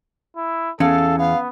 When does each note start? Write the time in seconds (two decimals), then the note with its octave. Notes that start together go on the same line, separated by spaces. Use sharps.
0.36 E4
0.80 E2 C#4 A4 F5
1.19 B3 F5